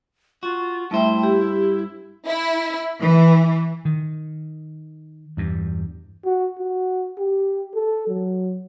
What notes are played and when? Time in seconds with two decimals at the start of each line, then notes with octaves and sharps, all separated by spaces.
0.43 F4 F#4
0.91 G2 A3 E4 C5 E5 G5
1.23 G4
2.27 E4
3.01 E3
3.85 D#3
5.37 E2 G2
6.25 F#4
6.59 F#4
7.18 G4
7.75 A4
8.07 F#3